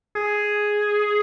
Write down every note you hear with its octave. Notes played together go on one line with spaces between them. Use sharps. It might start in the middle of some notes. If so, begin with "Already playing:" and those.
G#4